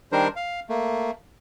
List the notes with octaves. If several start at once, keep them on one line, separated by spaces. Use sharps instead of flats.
D#3 G3 D4 A#4 C5
F5
A3 A#3